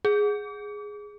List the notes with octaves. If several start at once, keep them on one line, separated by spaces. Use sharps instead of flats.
G#4